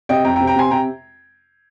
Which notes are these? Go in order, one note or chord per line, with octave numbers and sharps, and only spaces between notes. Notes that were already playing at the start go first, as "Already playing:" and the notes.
C3 D#5 G5
F2 G5 A#5
G5 A#5
C3
G5 A#5
C3 G#5 C6
C3 G5 A#5